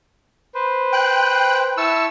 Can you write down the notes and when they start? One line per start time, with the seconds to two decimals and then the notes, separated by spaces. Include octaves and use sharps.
0.55 B4 C5
0.92 G5 F#6
1.77 E4 A5 C#6 E6